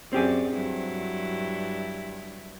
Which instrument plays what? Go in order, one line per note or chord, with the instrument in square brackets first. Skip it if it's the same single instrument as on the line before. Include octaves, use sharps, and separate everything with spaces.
[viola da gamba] F#2 D5 [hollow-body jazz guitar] C4 G4 G#4
[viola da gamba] G2 F#3 E4